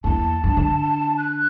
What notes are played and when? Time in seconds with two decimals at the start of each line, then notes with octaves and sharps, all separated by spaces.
0.04 E2 A#3 A5
0.44 G2
0.57 D3
1.18 F#6